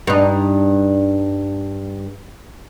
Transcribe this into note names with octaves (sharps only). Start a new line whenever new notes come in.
G2 D#4